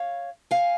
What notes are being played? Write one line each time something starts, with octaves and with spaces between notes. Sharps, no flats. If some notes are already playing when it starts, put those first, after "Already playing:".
Already playing: C#5 F5
F5 G#5